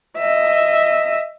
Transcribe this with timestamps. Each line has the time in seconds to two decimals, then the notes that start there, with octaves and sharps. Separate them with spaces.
0.17 D#5 E5